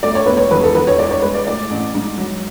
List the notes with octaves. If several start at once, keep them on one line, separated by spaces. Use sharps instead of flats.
A3 D5
C#5
E1 B4
C#5
E2 B4
A4
E2 B4
C#5
G#3 D5
C#5
G#3 B4
D5
A2 D5
A1
G#2
F#3